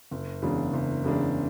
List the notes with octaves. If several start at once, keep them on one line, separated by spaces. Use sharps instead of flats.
F#1
E2 C#3 G#3 D4
F#1
E2 C#3 G#3 D4